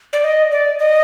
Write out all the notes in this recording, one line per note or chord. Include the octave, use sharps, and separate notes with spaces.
D5
D#5
D5
D#5